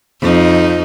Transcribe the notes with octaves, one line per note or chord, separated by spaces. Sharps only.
F2 D#4